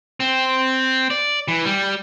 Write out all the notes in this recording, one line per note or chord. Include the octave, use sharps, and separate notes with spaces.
C4
D5
E3
G3